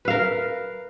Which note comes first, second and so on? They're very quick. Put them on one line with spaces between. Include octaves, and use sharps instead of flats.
B4 F5 A#4